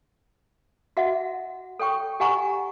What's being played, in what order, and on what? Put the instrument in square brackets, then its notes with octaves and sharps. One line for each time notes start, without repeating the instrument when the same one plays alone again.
[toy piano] F#4 D#5 E5 F#5
A4 C#5 G5 C#6
G4 D#5 F#5 G#5 A#5 C#6